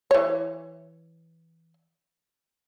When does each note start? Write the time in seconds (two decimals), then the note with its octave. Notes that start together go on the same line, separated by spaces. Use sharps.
0.11 E3 C#5